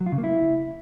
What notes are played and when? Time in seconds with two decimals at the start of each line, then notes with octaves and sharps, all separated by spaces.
0.01 F#3
0.06 F4
0.12 C#3
0.18 A#3
0.24 E4